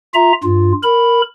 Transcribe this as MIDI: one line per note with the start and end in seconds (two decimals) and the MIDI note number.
0.14 0.33 65
0.14 0.33 76
0.14 0.33 82
0.43 0.72 43
0.43 0.72 65
0.83 1.21 70
0.83 1.21 83